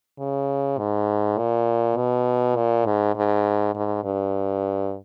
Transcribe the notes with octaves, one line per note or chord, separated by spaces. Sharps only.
C#3
G#2
A#2
B2
A#2
G#2
G#2
G#2
G2